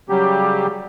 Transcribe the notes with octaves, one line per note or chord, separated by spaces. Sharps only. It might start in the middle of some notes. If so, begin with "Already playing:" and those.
C#3 F#3 G3 G4